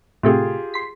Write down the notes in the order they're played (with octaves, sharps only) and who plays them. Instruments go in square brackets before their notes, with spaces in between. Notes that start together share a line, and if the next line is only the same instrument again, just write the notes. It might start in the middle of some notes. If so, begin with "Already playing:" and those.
[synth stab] A2 C3 A3 [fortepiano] F4 G4 G#4
[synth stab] C6 B6